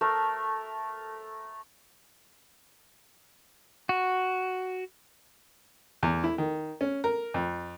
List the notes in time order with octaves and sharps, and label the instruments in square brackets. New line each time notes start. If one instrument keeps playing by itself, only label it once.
[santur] A3 A#4 C5
[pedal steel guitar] F#4
[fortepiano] E2
E4
D#3
C#4
A#4
F2